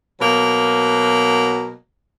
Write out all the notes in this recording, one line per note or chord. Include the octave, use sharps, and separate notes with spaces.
B2 F#3 A#3